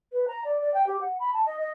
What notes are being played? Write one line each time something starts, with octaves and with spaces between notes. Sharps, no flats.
B4
A#5
D5
D5
G5
G4
F#5
B5
A5
D#5
D#5